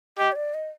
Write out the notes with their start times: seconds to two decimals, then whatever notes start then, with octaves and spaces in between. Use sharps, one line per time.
0.18 G4 D#5
0.32 C#5
0.36 D5
0.54 D#5